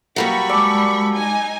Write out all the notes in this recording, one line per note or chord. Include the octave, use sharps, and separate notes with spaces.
F#3 G3 A#3 B5 C#6
G#3 D5 A5 E6
D#4 G#5